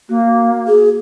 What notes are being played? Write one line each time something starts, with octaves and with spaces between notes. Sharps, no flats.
A#3 F#4
G#4